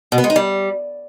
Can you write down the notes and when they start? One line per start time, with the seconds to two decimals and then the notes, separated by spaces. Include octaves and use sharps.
0.12 B2
0.18 B3
0.24 G#3
0.30 D#4
0.36 G3